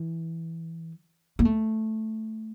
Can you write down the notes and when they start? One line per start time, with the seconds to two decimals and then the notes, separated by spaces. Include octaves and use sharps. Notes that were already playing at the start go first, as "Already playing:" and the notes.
Already playing: E3
1.39 A#3
1.45 A3